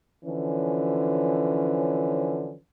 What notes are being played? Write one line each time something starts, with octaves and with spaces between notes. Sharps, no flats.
D3 E3 F3 C#4